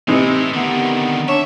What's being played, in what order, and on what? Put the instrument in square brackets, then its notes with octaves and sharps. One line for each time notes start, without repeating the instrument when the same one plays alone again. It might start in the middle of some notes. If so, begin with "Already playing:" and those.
[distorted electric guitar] A2 [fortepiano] C3 E3 D#4
[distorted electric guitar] D3 D#3 [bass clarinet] B3
[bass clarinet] D4 [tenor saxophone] C#5 [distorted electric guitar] E5